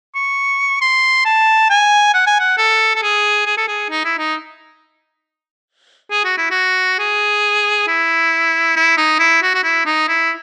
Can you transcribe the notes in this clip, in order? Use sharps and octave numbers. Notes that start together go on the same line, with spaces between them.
C#6
C6
A5
G#5
F#5
G#5
F#5
A4
A4
G#4
G#4
A4
G#4
D#4
E4
D#4
G#4
F#4
E4
F#4
G#4
E4
E4
D#4
E4
F#4
F#4
E4
D#4
E4